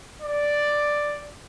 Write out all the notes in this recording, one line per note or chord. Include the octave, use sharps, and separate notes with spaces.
D5